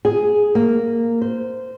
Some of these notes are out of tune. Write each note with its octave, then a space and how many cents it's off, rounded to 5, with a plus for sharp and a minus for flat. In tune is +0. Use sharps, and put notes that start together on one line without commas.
G#4 +5
A#3 -10
C5 -15